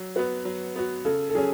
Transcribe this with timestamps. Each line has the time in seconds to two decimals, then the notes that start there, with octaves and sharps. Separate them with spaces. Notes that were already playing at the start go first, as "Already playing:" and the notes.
Already playing: F#3
0.16 B3 F#4 B4
0.45 F#3
0.76 B3 F#4
1.05 C#3 A4
1.30 A4
1.35 F#3 C#4 G#4